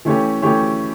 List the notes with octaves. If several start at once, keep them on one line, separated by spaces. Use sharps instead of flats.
E3 A3 C#4 G4 C#5
E3 A3 C#4 G4 C#5